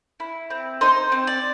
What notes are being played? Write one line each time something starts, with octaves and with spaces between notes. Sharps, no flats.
E4
C4
D#4 C5
C4
D5